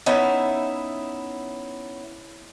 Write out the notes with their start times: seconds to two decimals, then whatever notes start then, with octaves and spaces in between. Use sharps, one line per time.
0.06 B3 C#4 D#4 E4 E5